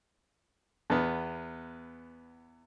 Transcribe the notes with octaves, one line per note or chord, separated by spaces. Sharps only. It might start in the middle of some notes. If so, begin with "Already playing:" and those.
E2 B3